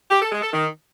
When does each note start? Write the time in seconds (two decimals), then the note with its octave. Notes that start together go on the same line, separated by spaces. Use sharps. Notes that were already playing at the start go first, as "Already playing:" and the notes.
0.11 G4
0.21 A4
0.32 G#3
0.43 A4
0.53 D#3